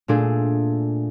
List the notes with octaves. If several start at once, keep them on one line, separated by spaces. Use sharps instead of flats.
A#2 A3 D4 G#4